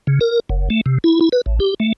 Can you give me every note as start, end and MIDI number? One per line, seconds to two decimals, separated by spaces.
0.07 0.19 49
0.21 0.40 70
0.49 0.69 30
0.70 0.81 57
0.86 0.98 48
1.04 1.20 64
1.21 1.29 64
1.32 1.41 71
1.46 1.59 33
1.60 1.74 67
1.80 1.93 57